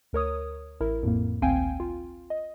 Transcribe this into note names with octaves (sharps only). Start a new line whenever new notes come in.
D2 A#4 C#5 D#6
A1 E4 A#4
F2 A2 A#3
G#1 D2 C4 F5 G5 G#5
F4
D#5